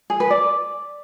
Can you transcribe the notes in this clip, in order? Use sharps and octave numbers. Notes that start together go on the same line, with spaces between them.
G#4
B4
D5